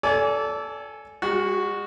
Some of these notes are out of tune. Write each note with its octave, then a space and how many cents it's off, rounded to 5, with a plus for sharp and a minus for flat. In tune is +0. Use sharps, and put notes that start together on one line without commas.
A4 -5 D5 -30 G#5 +15
G#3 -45 F#4 +0